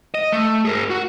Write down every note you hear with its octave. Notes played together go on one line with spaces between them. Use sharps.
D#5
A3
G#4 A#4
F#4